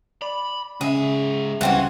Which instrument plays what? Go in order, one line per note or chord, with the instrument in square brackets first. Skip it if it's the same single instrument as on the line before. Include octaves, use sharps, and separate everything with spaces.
[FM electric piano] D5 [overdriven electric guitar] B5
[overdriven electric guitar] G#2 E5 [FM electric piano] C#3 [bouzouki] G#4
[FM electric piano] C#2 G3 F5 [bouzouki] E3 C4 F#4 [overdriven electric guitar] C#4